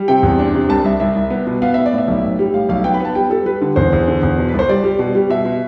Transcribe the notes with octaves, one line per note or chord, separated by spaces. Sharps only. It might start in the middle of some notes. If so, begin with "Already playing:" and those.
Already playing: G3
C3 G5
E2
D4
C3
C2 A5
C2 E5
C2 E5
C2
B3
B2
B3 F5
B3 E5
D5
A2
E5
B1
A2
G3
A2 F5
B1 F5
B3 G5
B5
B3 A5
G3 G5
G3 A4
G3 B4
D3
E2 C5
E2
D3
E2
B2
C2 B4
C5
G3 D5
G3
B2
G3
B2 E5
B2